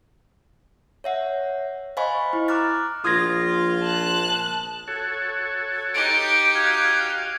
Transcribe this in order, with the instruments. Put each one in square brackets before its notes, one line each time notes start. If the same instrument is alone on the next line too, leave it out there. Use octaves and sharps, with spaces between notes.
[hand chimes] C#5 E5 F#5
C5 D#5 F5 G#5 B5 C#6
E4
A#5 D6 F6 F#6 A6
[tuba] A#1 [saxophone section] F4 [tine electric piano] D#6 G#6 A#6
[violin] A5 F#6
[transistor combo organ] F#4 A4 C#5
[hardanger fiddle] D#4 G4 [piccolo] D7
[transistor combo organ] F#4 F5 [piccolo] G#6